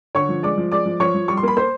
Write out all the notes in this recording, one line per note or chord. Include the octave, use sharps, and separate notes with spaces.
D3 C#5 C#6
F3
G#3 D5 D6
F3
G#3 D5 D6
F3
F3 C#5 C#6
F3
G3 C#6
C6
A#3
B5
A#3 C5 C6